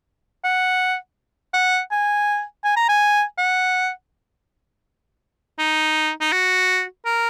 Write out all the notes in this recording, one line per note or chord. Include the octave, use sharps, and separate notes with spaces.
F#5
F#5
G#5
G#5
A#5
G#5
F#5
D#4
D#4
F#4
A#4